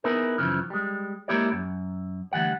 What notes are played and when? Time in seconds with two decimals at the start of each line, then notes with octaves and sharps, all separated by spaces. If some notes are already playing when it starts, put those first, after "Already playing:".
0.04 B3 D#4 E4 G#4 A#4 B4
0.38 F#2 C#3 E3 F3
0.70 G3 G#3
1.28 G#3 A#3 E4 G4 C#5 D5
1.52 F#2
2.33 D2 G2 E3 G3 F#5